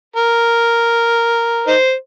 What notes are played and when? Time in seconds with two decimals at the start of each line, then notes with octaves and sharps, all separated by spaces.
0.16 A#4
1.67 D#4 C5